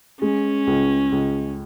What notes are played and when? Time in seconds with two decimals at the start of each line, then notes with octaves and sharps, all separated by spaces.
0.21 G#3 C#4
0.67 C#2
1.12 C#2